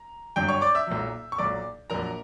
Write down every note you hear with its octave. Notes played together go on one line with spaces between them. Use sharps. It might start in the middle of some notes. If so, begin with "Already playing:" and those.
Already playing: A#5
G1 G2 F#3 G5 G6
C#5 C#6
D5 D6
E5 E6
B1 A#2 F#3
C#6
B1 A#2 F#3 D5 D6
A#1 A#2 F#3 A#4 A#5